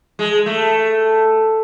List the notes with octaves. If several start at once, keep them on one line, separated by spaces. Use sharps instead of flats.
G#3
A3